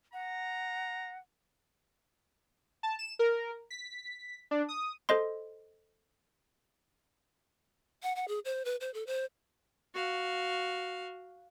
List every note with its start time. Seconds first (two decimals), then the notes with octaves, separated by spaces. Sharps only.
0.13 F#5 A#5
2.83 A5
2.99 E7
3.19 A#4
3.70 B6
4.51 D4
4.69 D#6
5.09 A4 C5 D#5 C6
8.03 F#5
8.16 F#5
8.28 G#4
8.45 C5
8.65 B4
8.80 C5
8.94 A4
9.07 C5
9.94 F#4 F5